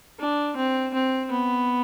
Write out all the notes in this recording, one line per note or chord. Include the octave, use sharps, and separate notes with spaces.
D4
C4
C4
B3